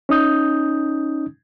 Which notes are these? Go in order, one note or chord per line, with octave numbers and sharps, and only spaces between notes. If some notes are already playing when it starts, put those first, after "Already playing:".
C#4 D#4 D#6 G6